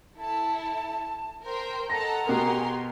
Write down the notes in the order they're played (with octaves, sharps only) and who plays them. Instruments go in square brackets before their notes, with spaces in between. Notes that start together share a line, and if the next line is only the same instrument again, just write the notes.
[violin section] E4 A4 [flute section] A5
[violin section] A#4 G5 [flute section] C5
[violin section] A4 D#5 A5 [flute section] F#5 A#5 [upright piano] A#6
[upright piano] B2 G#4 A#4 [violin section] G4 G#5 C6